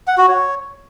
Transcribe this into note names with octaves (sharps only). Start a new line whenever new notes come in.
F#5
F#4
C#5